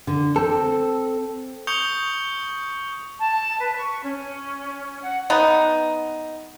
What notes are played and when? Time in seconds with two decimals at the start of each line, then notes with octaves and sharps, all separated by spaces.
0.07 D3
0.36 C4 A4
1.67 C#6 D#6 G6 C#7 F7 G7
3.20 A5
3.62 B4
3.75 C#6
4.03 C#4
5.02 F#5
5.30 B3 D#4